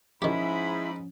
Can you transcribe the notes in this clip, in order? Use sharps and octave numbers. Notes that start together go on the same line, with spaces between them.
G#2 D#3 F3 C#4 E4 G4 B5